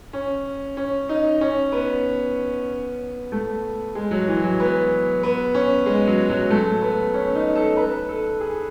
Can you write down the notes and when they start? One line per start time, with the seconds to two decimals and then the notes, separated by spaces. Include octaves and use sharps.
0.13 C#4
0.77 C#4
1.09 D#4
1.41 C#4
1.72 B3
3.32 A3
3.95 G#3
4.11 F#3
4.28 E3
4.44 F#3
4.60 B3
5.23 B3
5.54 C#4
5.86 G#3
6.07 F#3
6.29 F#3
6.50 A3
6.82 B3
7.14 C#4
7.35 D#4
7.56 A4
7.77 B4
8.09 A4
8.41 G#4